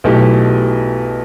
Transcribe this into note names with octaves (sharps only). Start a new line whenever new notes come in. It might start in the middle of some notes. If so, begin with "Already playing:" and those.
B1 B2 A3 E4 G4